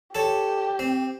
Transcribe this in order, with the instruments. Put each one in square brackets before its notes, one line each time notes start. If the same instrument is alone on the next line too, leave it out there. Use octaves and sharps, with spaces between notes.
[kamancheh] G4 [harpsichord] A4 C#5
[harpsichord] C4